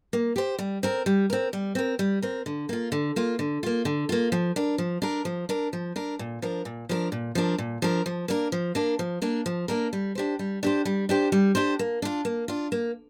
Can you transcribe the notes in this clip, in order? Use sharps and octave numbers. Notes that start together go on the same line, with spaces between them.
A#3
G4 C5
G3
C4 A#4
G3
C4 A#4
G3
C4 A#4
G3
C4 A#4
D3
A#3 F4
D3
A#3 F4
D3
A#3 F4
D3
A#3 F4
F3
D4 A#4
F3
D4 A#4
F3
D4 A#4
F3
D4 A#4
A#2
F3 D4 A#4
A#2
F3 D4 A#4
A#2
F3 D4 A#4
A#2
F3 D4 A#4
F3
A#3 D4 A#4
F3
A#3 D4 A#4
F3
A#3 D4 A#4
F3
A#3 D4 A#4
G3
D4 G4 C5
G3
D4 G4 C5
G3
D4 G4 C5
G3
D4 G4 C5
A#3
D4 F4
A#3
D4 F4
A#3